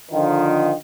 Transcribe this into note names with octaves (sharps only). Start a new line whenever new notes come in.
D3 D#3 F3